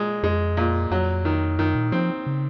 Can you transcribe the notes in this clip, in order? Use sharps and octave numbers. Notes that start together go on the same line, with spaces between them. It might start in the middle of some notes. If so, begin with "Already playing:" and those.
Already playing: A#2 G#3
F2 G#3
A#2
F2 F#3
D#3
F#2 D#3
A#2
F3 C4
C#3